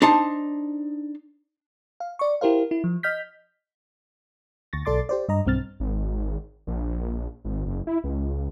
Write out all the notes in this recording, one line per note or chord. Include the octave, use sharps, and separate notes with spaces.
D4 D#4 C5 A5
F5
D5 C#6
E4 G4 A#4 C5 F5
E4
F3
D#5 F6 G6 B6
D2 C#6 A6 A#6
B1 A4 D5 C6 D6 A6
G4 C5 D5
G2 D#5 A#5
B1 G2 C4 F6 A6
G#1
A#1
G#1
F#1
E4
C#2